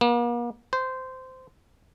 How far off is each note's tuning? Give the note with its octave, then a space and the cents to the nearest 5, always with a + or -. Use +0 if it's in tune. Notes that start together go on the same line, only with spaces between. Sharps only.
A#3 +40
C5 -15